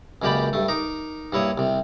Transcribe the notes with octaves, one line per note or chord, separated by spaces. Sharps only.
C#2 F#2 A#3 G4 D5 B5
G2 A3
D#4 A#4 D6
G2 A#3 E4 C#5 D#6
C2 C3